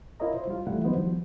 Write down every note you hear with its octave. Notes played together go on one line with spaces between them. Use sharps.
E4 F4 A#4 C#5 D#5 A#5
C5
G3 F4
E3 G3 A3 E4 F#5
D#3 F3 F#3 B3 D#4 C5
F3 G3